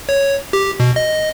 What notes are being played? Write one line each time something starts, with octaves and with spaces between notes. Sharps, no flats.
C#5
G4
B2
D#5